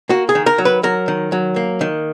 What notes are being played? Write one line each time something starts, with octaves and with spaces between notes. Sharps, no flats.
A#3 F#4
G#4
D#3
A#4
F#3
B4
F#3 A#4
D#3
F#3
A#3
D#3